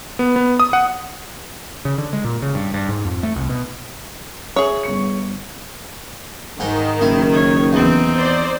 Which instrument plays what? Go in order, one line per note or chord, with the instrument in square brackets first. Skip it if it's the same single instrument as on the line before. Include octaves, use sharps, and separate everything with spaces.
[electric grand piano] B3
B3
D#6
F#5
[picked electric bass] C#3
D3
G#3
A#2
C#3
G2
G2
G#2
F2
A3
C2
B2
[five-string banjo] G#4 C#5 [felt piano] E5 C#6 D#6
[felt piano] G1 C#6 C#7
[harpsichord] G#2 D#4 [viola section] D#3
[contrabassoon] F#1 [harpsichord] E4
[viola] C#5
[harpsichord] E2 [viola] C4 D#4
[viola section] C5 D5